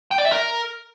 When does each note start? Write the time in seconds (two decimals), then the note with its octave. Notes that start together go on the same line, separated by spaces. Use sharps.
0.11 G5
0.18 D5
0.25 E5
0.32 A#4